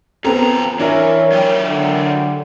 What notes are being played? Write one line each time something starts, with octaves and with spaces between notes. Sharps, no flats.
F2 B3 C4 A4 A#5
E3 D4 E4 A#4 C#5
F#3 G4
D3